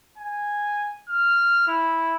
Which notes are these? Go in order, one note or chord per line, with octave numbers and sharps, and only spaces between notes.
G#5
F6
E4